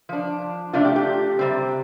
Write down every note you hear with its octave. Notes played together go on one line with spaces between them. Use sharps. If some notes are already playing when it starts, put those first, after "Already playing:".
F3 D4
C3 A3 D4 F4
G4
G4
C3 G3 C4